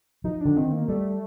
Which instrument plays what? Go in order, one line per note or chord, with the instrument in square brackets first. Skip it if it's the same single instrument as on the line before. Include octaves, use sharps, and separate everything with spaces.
[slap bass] F3 [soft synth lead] D#4
[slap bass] D3 [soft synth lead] D4
[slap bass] D#3 [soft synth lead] C4
[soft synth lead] A#3
[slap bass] G3 [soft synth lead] A3